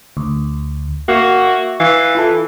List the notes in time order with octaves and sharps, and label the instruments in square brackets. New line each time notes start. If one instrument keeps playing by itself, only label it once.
[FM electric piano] D2
[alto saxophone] A#3 [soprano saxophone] F#4 [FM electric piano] E5 C#6 E6
[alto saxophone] E3 [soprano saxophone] F5
[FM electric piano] E4 F4 A4